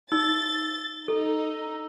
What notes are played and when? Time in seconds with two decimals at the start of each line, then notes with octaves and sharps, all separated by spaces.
0.12 D#4 E6 A6
1.08 D#4 A4